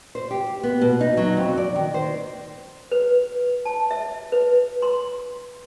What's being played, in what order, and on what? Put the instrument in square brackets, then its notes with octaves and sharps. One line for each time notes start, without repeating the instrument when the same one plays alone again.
[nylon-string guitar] C5
G4
B3
B2
D#4
F#3
F2
D5
D#3
C5
[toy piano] B4
A5
E5
B4
C6